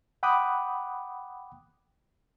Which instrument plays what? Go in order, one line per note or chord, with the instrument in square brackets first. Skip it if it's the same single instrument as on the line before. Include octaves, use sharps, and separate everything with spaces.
[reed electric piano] F#5 G5 B5 D6 D#6 F#6